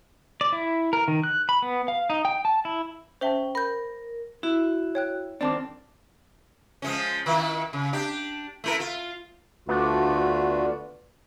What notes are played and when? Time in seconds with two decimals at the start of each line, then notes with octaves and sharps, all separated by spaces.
0.41 D5
0.52 E4
0.93 A#4
1.08 D#3
1.24 F#6
1.49 B5
1.62 B3
1.88 F5
2.10 D#4
2.25 G5
2.45 A5
2.65 E4
3.21 C#4 C5 E5 G5 A5
3.55 A#4 B5 G6
4.43 E4 F#4
4.95 C#5 G5 F#6
5.41 D#3 C4 D4 D5 A5 D6
6.82 F3 G#3 C#4
7.26 D#3 E4 F4
7.73 C#3
7.93 D4 G4
8.64 A3 E4 A#4
8.80 F4
9.69 D2 A3 B3 D4 F4 F#4